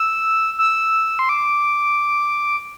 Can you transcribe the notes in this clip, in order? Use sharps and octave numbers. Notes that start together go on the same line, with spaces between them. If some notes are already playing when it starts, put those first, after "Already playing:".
Already playing: E6
E6
C6
D6